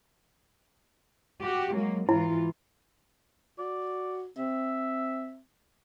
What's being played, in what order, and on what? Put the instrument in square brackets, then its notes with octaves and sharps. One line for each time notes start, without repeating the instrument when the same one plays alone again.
[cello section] F#4 G4
F#3 G#3 A#3
[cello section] G#2 E3 F4 [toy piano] E4
[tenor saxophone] F#4 [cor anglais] D5
[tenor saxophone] C4 [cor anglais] E5